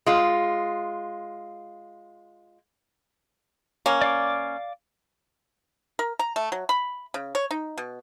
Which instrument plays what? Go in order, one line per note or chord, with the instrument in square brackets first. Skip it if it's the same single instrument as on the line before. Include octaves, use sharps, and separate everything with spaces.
[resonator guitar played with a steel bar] G#3 F4
[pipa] A#3 C#4
[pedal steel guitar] D5 F5 D6
[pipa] A#4
A#5
A3
F#3
B5
C#3
C#5
D#4
B2